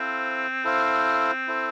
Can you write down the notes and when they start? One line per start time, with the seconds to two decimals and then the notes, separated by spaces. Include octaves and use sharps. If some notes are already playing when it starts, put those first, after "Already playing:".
Already playing: C4 E4 A4 C5 F5
0.64 E4 A4 C5 F5
1.48 E4 A4 C5